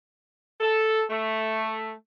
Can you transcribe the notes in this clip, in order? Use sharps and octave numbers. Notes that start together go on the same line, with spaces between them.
A4
A3